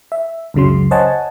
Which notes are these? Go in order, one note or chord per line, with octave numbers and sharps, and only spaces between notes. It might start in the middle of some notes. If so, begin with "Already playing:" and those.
E5
C#2 F#2 C#3 F#3 C6
C5 C#5 D#5 F#5 G#5 A5